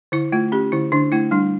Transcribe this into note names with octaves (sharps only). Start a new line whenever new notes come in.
D3 E4
A3 F4
C#4 G4
D3 E4
D3 D4
A3 E4
G3 D4